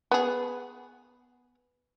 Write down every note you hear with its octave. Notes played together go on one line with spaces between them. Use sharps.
B3 G#4